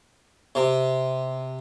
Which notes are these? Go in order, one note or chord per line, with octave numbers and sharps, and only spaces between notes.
C3